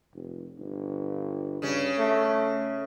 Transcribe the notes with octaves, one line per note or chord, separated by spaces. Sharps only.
F1
G1
G2 C#3 C#4
A3